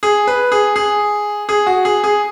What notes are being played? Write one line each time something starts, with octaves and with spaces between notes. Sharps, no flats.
G#4
B4
G#4
G#4
G#4
F#4
G#4
G#4